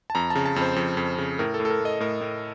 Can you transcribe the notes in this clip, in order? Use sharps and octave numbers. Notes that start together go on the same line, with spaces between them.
A5
F2 A#5
A5
C#3
A5
F2
C5
F2
F2
C#3
A2 A#4
A4
A2
A4
A#4
A2 D#5
A2 A#4
A2